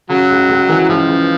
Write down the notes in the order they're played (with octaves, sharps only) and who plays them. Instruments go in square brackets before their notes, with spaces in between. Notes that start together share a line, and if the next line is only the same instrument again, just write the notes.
[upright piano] C#3 [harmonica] F#3
[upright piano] C#2
C#2
E3
[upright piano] C#2 [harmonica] F3
[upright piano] C#3